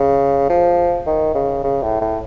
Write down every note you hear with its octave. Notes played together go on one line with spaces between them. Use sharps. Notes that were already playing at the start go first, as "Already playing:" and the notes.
Already playing: C#3
F3
D#3
C#3
C#3
A2
A2